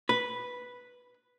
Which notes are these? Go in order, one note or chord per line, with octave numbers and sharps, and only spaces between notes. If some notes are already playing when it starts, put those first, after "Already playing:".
B4